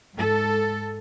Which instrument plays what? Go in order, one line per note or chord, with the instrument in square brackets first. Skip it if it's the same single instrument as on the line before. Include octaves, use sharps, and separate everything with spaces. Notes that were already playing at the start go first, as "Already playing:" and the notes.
[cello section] G#2 A4